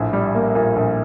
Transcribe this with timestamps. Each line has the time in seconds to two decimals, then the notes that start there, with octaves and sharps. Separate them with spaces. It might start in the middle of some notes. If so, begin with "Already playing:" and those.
Already playing: A#1 A2
0.13 G3
0.35 A#3
0.55 A#2
0.76 A#1